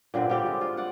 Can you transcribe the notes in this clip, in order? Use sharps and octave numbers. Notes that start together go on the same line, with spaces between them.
A#2 D3 C4 B4
G3 C4 G4 D5
G#3
F4
D5 F#5